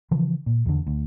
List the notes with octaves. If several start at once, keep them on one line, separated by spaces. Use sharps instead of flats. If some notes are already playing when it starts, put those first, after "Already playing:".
C#3 E3 F3
A#2
E2 D3
D2